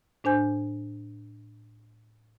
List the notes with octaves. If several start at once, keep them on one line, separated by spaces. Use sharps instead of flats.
A2 D4 C5 G#5 G6